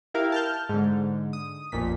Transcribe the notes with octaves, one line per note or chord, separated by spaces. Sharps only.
E4 G4 A#4 F5
A5 F6 G6
G#2 D3
D#6
A1 F2 A#2 B6